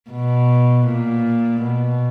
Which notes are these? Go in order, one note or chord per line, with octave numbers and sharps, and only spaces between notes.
B2
A#2
B2